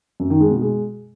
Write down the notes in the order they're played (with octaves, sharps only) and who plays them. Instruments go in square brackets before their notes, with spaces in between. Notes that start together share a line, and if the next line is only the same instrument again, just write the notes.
[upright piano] F#2
D#3
G#3
B2
G#3